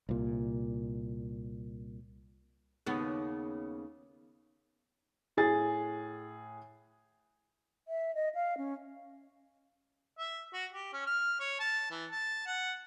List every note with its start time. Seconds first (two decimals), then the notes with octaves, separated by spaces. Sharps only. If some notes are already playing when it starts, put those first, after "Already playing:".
0.09 C2 A#2
2.86 D#2 C#3 B3
5.37 A2 G#4 A6
7.88 E5
8.15 D#5
8.35 F5
8.57 C#4
10.19 E5
10.53 F#4
10.73 G4
10.93 C#4
11.07 F6
11.40 C#5
11.60 A5
11.91 E3
12.12 A5
12.46 F#5